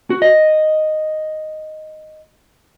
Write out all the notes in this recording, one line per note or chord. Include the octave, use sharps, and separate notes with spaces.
F#4
D#5